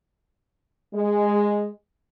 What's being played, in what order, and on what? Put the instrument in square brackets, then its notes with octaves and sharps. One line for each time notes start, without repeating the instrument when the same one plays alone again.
[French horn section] G#3